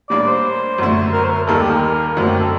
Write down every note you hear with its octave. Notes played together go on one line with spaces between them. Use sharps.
A2 G3 A#3 D4 D5
C5
F#2 D3 A3
A#4
C5
A#4
D#2 D#3 G3 A#3 A4
G4
A#4
F#2 D3 A3 C4 F#4
G4
A4